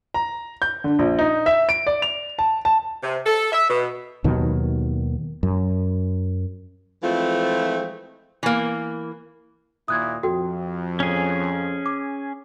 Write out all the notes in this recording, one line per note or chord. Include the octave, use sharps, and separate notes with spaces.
A#5
G6
D3
A#1
D#4
E5
D7
D5
F7
A5
A5
C3
A4
E5
B2
D#2 B2 D#3 F#3
F#2
E3 F3 G#3 A3 C4 F4
E3 A#3
D#2 A#2 E4 D#6 F#6 G#6
F2 F#4 A4 G5
C#4 G#4
D6